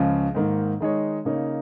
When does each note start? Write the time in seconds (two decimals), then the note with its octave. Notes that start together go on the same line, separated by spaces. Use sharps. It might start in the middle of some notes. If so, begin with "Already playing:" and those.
Already playing: C#2 C#3 F3 C#4 F4
0.34 G#2 D#3 A#3
0.80 D#3 G#3 D#4 C#5
1.25 C#3 A#3 D#4 C#5